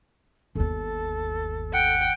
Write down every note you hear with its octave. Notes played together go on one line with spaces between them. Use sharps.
G1 D#2 A4
F#5 G5